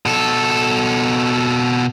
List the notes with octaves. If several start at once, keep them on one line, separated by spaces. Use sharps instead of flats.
B2 A4